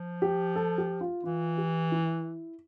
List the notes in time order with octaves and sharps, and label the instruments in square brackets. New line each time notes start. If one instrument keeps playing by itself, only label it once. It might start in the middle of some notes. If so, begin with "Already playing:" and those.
Already playing: [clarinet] F3
[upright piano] G4
A4
G4
F4
[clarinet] E3 [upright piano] F4
[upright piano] G4
E4